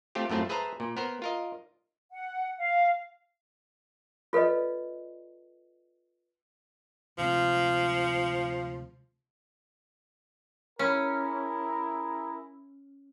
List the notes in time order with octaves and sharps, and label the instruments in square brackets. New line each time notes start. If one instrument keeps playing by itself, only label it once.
[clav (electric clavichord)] A3 C4 F4 G4
F#2 A2 A3 C4 F4
G#4 B4 C5 E5 A5 A#5
A#2
B3 A#4 C5
F4 A#4 D#5
[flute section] F#5
F5
[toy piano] F4 A4 B4 D5 D#5
[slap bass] D2 C3 G#3 [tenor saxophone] F3
[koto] C#4 [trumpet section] E4 G#4 A#4